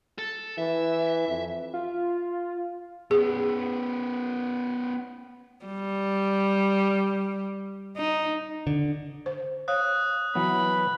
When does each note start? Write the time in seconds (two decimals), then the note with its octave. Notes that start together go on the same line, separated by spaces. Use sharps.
0.19 A4
0.58 E3 E5
1.28 F2
1.74 F4
3.11 B3 C#4 G#4
5.66 G3
7.97 D#4
8.67 D3
9.26 C5
9.68 C#5 F5 D#6 F#6
10.35 E3 F#3 B3 B5